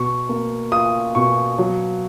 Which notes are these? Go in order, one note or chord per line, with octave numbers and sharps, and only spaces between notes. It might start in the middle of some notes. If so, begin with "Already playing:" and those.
Already playing: B2 C#6
A#3
F4 D#6
B2 C#6
F#3